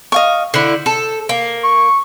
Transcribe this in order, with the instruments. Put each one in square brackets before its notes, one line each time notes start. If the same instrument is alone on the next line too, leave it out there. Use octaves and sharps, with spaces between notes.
[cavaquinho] D#5 F5 C#6
[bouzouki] D3 E4 [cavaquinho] C5
[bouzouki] A4
A#3
[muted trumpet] C#6